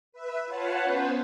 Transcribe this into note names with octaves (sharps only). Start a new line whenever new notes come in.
B4 E5
F4 B4 C#5 F5 F#5 A5
B3 C#4 B4 C5